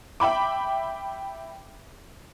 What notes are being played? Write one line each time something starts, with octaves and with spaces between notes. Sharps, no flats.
E5 G5 B5 D6